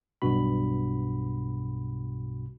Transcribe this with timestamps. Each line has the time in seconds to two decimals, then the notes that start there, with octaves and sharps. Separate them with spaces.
0.22 B1 G2 B2 F#4 B5